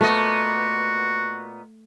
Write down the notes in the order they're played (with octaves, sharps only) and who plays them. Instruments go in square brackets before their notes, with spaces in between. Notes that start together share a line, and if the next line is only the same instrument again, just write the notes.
[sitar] A#2 B3 D#5 [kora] A3 [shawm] F#4